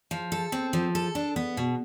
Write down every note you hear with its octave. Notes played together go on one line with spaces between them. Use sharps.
F3
A4
C4
F3
A4
D4
B3
B2